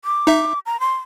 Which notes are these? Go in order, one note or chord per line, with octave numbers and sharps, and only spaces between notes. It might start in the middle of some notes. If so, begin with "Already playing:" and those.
D6
D#4 E5
A#5
C6